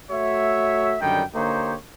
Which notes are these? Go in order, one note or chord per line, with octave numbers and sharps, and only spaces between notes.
A3 F#4 C#5 E5
F#2 D3 D#3 G3 G5
D3 A#3 D#4 G4 C5 C#5